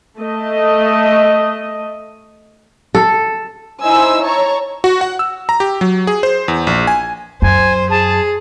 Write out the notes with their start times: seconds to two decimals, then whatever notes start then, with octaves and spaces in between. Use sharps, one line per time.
0.19 A3 D#5
2.95 A4
3.81 D#4 E4 C5 D#5 G#5 E6
4.22 C#5 A5 A#5 C#6
4.84 F#4
5.01 F#5
5.19 E6
5.49 A#5
5.60 G4
5.81 F#3
6.07 G#4
6.23 C5
6.48 E2
6.67 A#1
6.87 G#5
7.42 F#2 C5 G#5
7.90 G#4 A5